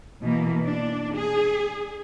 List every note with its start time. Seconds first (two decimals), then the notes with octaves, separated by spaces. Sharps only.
0.23 B2 E3 A#3
0.65 D4
1.15 G#4